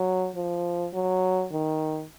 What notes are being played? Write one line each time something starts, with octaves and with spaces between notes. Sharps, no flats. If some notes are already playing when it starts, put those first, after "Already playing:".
Already playing: F#3
F3
F#3
D#3